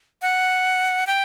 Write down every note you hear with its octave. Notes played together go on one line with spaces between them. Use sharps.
F#5
G5